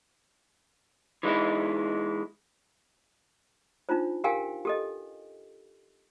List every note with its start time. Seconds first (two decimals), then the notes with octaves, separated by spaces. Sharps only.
1.23 E3 G#3 D#4 E4
3.89 D4 D#4 F4 C5
4.24 G4 A#4 F5 G5 G#5
4.65 G4 A4 D#5